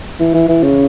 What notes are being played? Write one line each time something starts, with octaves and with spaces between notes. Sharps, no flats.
E3
E3
E3
C#3